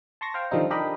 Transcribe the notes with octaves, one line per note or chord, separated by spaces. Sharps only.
A5 C6 C#6 A#6
C5 F5 G5
D3 D#3 F3 G3 C4 D#4
D4 G4 A#4 D#5 B5